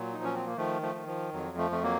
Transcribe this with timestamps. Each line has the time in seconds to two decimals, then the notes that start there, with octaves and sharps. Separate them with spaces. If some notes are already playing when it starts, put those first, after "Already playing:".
Already playing: A#2 F#3
0.14 F3 D#4
0.24 C#4
0.35 C4
0.46 A#3
0.57 D#3 F3 A3
0.82 F3 A3
0.95 D#3
1.07 F3
1.33 F2 F#3
1.57 F3 A3
1.70 F2 A3
1.83 F#3 A#3